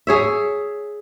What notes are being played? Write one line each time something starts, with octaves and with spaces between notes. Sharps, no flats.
G#4 C#5 E5